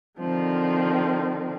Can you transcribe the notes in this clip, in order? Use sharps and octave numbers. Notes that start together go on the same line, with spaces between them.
D3 D#3 F3 C4